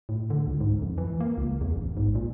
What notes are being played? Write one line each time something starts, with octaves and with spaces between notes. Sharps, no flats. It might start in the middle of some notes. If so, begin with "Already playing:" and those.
A2
D3
C#2
G#2
F2
E3
A#3
C#2
E2
A1
G#2
A#2